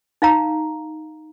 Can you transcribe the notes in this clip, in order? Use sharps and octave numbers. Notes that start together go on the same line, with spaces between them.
D#4 F5 A#5